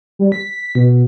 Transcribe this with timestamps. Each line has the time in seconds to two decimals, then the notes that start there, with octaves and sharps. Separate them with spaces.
0.19 G3
0.32 B6
0.75 B2